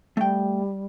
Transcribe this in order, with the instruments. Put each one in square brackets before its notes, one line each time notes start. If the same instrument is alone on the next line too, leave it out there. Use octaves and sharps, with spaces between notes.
[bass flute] G3 [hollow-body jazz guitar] A3 G5